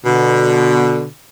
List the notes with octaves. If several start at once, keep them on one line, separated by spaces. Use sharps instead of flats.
B2 D3